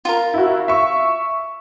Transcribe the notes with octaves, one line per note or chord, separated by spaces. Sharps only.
F4 A#4
E4 F#4
E5 C#6